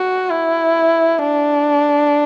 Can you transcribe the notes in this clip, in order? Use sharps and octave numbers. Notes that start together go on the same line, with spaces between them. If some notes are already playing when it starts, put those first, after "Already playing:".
Already playing: F#4
E4
D4